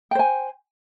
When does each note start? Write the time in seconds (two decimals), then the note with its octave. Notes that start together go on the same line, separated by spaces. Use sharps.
0.11 G5
0.15 C5
0.19 G#5